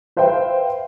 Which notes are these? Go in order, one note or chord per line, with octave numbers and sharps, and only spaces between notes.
B4 C5 E5 F5 G5